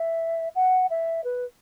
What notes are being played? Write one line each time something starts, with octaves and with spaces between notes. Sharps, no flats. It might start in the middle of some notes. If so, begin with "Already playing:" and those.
Already playing: E5
F#5
E5
B4